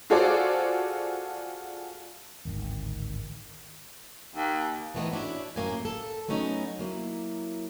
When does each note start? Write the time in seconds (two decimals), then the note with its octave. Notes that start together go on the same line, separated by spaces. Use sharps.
0.10 F4 F#4 G#4 A4 C5 D5
2.45 D1 G#1 G#2 D#3
4.36 D#2
4.94 E3 F3 A3 B3 D#4
5.13 C#4 D4 E4 F#4
5.56 F#2 A2 A#3 C#4 G4 G#5
5.85 A4
6.28 F#3 A3 B3 C#4 D#4
6.79 F#3 A#3 E4